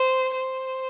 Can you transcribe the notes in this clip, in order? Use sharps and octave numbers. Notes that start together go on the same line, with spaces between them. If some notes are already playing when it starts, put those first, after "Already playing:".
Already playing: C5
C5